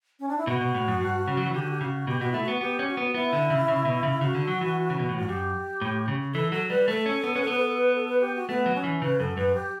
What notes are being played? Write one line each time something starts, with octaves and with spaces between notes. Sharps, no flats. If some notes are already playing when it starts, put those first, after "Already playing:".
C#4
D4
E4
B2 F#4
B2
A2
F#2
G2
C#3
F#3
E3
D3 G4
F#4
G4
C#3 F#4
B2 G4
B2 F#4
A3 E4
B3 F#4
B3 G4
C#4
F#4
B3
F#4
B3 E4
D3
C#3
C#3
B2
C#3
C#3 F#4
D3
F#3
E3
C#3
B2
A2
G2 F#4
F#2 G4
A2
C#3
E3 A4
F#3 A4
G3 B4
A3 A4
C#4
B3
C#4 B4
A4
B3 B4
A4
B4
A4
B4
G4
F#4
A3 B3
F#3
C#4
E3
C#3 B4
F#2 A4
F#2 B4
G4